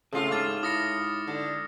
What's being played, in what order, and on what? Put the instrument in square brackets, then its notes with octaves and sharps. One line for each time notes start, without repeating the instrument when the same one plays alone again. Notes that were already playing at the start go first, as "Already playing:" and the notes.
[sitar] A2 F4 [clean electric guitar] C#3 A3 C4 [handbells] G#4 A4 D#6
[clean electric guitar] G#2 G4 [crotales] D6 F6 A6
[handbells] E4 B5 [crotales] D#6 A#6 C#7
[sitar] D3